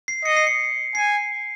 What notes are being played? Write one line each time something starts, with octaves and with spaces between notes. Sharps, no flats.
C7
D#5 C#7
C7
C#7
G#5 C7